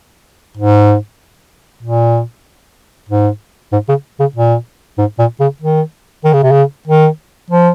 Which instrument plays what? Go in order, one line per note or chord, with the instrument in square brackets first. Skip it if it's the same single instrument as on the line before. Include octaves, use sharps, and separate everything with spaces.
[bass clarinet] G#2
A#2
G#2
G#2
C#3
C#3
A#2
G#2
A#2
C#3
D#3
D#3
C#3
C3
C#3
D#3
F3